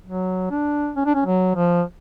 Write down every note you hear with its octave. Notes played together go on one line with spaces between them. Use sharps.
F#3
D4
C#4
D4
C#4
F#3
F3